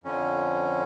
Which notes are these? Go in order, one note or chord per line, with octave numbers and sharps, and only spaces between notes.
F2 D3 F3 C#4